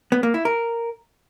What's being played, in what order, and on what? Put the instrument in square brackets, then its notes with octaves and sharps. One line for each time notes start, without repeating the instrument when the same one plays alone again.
[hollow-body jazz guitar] B3
A#3
E4
A#4